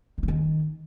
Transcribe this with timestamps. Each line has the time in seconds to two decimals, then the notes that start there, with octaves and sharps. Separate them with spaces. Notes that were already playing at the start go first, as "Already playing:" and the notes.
0.18 D#3
0.23 E3
0.28 D#3